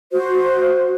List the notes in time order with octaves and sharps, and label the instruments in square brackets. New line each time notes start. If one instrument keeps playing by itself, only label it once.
[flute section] F#4 C5